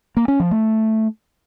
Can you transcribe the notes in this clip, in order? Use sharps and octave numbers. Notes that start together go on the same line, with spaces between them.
A#3
C#4
F3
A3